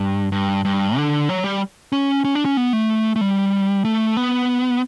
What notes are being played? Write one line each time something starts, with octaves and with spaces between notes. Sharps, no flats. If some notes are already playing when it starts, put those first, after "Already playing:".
Already playing: G2
G2
G2
D3
F#3
G3
C#4
C#4
D4
C#4
B3
A3
A3
G3
A3
B3